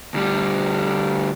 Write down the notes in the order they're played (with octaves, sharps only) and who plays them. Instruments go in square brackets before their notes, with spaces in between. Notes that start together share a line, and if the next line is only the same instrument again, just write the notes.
[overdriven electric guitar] D2 G3